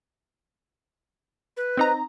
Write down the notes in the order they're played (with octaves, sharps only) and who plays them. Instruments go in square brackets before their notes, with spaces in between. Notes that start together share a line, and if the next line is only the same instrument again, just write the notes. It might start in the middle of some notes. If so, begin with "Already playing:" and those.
[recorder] B4
[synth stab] C4 D#4 A#5